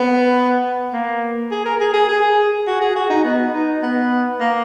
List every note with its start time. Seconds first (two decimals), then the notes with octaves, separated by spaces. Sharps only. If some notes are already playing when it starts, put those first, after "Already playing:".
Already playing: B3
0.93 A#3
1.52 G#4
1.65 A#4
1.81 G#4
1.94 G#4
2.08 G#4
2.67 F#4
2.81 G#4
2.96 F#4
3.10 D#4
3.24 B3
3.53 D#4
3.83 B3
4.40 A#3